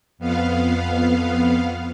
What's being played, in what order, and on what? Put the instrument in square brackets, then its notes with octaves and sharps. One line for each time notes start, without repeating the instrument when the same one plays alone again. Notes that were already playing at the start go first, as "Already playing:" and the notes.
[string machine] F2 B3 F5